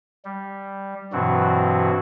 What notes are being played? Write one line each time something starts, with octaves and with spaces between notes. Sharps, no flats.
G3
G2 B2 E3 F#3 C4 F#4